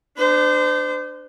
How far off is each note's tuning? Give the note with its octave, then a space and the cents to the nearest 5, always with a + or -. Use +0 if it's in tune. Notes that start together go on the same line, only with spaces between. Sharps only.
D4 +20 C5 -30